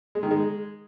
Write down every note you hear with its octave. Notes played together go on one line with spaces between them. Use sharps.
G#3
D#3
G#3